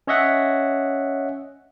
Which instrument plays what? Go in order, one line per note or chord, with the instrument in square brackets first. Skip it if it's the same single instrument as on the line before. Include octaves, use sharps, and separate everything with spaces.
[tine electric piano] C#4 C#5 D#5 E5 F#5